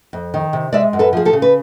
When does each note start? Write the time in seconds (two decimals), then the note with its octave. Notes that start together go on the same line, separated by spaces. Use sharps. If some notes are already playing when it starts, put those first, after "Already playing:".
0.13 F2
0.34 D#3
0.53 C3
0.73 G#3 D5 E5
0.93 F#2
0.99 A4 B4
1.13 F3 G#4
1.25 G4 A4
1.33 C#3
1.42 B4